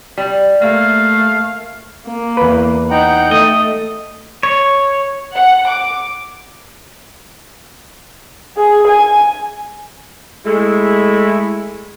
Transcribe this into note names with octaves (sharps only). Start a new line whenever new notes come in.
G3
A3 A#3 F5
A#3
E2 B4
D#4 F#5 G5 A#5
A3 D#5
C#5
F#5
D6
G#4
G#5
G#3 A3 E4